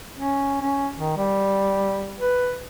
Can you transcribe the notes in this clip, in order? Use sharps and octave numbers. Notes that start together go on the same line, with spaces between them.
C#4
C#4
D#3
G3
B4